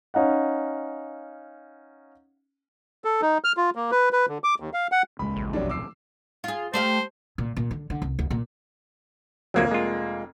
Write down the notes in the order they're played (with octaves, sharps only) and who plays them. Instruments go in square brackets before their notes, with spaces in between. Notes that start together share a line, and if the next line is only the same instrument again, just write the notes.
[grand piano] C#4 D#4 F5 F#5
[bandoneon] A4
D#4
F6
F4
A#3
B4
B4
D3
D6
D#2
F5
F#5
[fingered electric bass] D#1 C#2 G#3 [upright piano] B5
[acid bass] A1
[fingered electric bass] D#1 B1 F2 [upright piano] F#3 G3 D4
[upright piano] D6 E6 C7
[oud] F4 G#4
[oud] A3 G4 F5 [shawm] C5
[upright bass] A#2
A#2
D3
D3
C2
D2
A#2
[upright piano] F1 A#3 G#6 [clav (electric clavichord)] D2 F3 F#3
[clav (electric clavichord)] G#3 F4